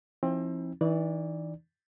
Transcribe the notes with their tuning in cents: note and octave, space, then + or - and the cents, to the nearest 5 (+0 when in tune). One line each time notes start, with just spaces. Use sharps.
F3 -30 C4 +30 E4 -45
E3 -30 D#4 -45 D5 +0